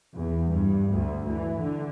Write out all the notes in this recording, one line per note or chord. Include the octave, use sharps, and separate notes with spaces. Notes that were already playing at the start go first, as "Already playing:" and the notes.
E2
G2
D2
E3
D3